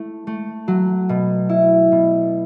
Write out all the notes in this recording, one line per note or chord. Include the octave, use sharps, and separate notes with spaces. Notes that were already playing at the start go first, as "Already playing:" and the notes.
Already playing: A3 E4
A3
F#3
B2
E4
B2